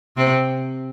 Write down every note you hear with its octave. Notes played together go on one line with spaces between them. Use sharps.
C3 C4